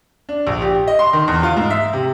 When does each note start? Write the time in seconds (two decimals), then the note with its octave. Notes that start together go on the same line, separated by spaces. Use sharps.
0.29 D4
0.47 A#1
0.62 G4
0.87 D#5
0.99 C6
1.13 D#3
1.28 E2
1.43 F4
1.57 G#2
1.70 E5
1.93 C3